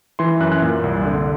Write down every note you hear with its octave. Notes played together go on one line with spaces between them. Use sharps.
E3 C6
F#2 F#6
F#6
A#2
C2
D3